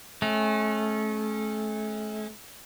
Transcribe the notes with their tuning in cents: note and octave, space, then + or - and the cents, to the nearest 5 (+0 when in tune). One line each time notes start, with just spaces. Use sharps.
A3 -40 C#4 -25